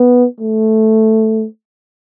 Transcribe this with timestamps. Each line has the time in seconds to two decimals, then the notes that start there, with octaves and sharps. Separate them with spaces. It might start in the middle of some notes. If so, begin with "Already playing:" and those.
Already playing: B3
0.40 A3